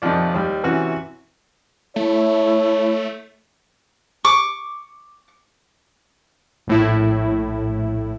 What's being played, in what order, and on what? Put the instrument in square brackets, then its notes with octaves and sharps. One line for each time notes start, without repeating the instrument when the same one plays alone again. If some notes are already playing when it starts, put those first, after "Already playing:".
[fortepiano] A#1 F2 C3 D#3 F3 D5
D#2 G3
C3 E3 C#4 F#4
[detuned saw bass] A3 [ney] E4 [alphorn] C#5
[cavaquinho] C#6 D6
[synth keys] A#1 A2 E4